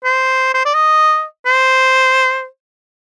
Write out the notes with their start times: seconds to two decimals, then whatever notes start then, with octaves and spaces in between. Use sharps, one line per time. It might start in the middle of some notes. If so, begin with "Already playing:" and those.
0.04 C5
0.54 C5
0.65 D5
0.74 D#5
1.46 C5